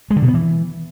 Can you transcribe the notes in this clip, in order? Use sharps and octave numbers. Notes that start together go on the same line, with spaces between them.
G#3
D3
B2
B3
E3